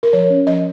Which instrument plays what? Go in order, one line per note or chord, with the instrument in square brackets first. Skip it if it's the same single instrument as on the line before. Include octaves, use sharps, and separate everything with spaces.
[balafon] A#4
F3 C#5
C#4
F3 D#5